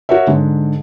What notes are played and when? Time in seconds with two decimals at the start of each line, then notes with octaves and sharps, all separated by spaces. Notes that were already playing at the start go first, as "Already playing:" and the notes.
0.09 F#4 A#4 C#5 E5
0.27 G#2 D3